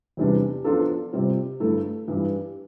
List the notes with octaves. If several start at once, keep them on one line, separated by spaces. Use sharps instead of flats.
E2 C3 E3 G3 D4
F3 B3 D4 F4 A4
C3 G3 C4 F4
G2 D3 A3 E4 A4
G2 E3 G3